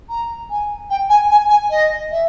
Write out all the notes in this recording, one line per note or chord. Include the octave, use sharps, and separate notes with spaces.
A#5
G#5
G5
G#5
G#5
G#5
D#5
E5